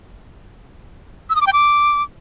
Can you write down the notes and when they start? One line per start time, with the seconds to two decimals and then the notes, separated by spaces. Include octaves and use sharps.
1.30 E6
1.35 D#6
1.41 D6
1.47 G5
1.53 D6